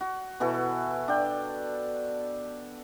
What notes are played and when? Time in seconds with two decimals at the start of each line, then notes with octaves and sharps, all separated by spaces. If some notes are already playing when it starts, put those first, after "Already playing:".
0.01 F#4
0.40 B2 E3 F#4 A4
1.08 D4 G5